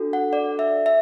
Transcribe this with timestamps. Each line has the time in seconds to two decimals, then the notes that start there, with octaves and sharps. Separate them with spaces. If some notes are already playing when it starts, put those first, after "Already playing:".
Already playing: D4 F#4 A4
0.13 F#5
0.33 D5
0.59 E5
0.86 E5